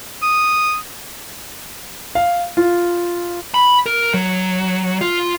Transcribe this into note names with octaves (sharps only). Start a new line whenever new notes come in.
D#6
F5
F4
B5
A#4
F#3
F4